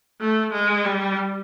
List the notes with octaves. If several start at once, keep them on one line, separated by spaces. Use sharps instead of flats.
A3
G#3
G3